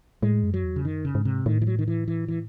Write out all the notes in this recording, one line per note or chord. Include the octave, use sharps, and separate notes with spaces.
A2 G#3
F#2
F#3
E2
C#3
F#2 D#3
C#3
G#2
C3
A2 D#3
E3
F#3
D#3
E3
E3
E3